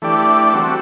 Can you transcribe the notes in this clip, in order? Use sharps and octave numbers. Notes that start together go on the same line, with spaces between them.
E3 A3 D4 G4 D5
G3 C4 F#4 A4